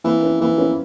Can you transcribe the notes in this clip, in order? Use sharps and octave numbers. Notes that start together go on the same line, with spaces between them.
E3 A#3 C4
B3 C#4
E3 A#3 C4
B3 C#4